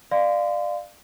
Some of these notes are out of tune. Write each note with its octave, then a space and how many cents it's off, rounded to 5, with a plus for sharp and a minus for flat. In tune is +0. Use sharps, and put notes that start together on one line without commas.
D5 +25 F5 +0 C6 -30